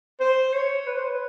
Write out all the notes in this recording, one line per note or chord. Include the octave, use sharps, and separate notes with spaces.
C5
C#5
B4
C5
B4